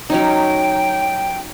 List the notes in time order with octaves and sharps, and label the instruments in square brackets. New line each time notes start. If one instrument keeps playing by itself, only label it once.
[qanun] F#3 C#4 D#4 [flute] G5